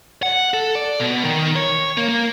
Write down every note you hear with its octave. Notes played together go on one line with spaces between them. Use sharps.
F#5
A4
D5
B2
D#3
C#5
A#3
A#3